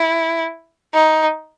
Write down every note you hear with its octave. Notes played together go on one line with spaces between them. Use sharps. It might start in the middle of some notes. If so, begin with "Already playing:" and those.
Already playing: E4
D#4